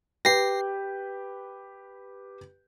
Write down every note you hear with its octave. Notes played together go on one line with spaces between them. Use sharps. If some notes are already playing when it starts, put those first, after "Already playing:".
G4 B4 G5 A#6 C7